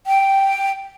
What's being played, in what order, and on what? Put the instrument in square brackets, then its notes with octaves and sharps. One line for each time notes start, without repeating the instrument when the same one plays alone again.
[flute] G5